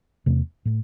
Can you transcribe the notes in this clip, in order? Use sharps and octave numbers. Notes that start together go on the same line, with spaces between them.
E2 C3 A3 C4
A2 A3